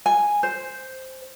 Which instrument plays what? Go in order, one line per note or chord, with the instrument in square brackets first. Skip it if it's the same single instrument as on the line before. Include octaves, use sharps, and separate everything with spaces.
[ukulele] G#5
C5